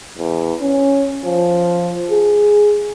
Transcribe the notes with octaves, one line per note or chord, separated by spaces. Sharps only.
E2
C#4
F3
G#4